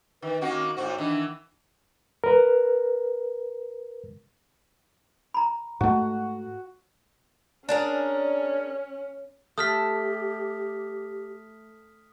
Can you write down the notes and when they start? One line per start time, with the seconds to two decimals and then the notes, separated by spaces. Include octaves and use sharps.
0.22 D#3 B4
0.41 D#3 A#3 C#4 F#4
0.77 A2 C3 F#4 C5
0.98 D#3 E3 D4
2.24 A#4 B4
5.34 A#5 B5
5.81 G#2 A3 F#4
7.69 C#4 D4 G#4 A#4
9.58 A3 G4 D#6 F6 B6